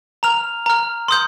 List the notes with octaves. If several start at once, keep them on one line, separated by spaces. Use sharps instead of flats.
A#5 F6 F7
A#5 F6
C6 D#6 G6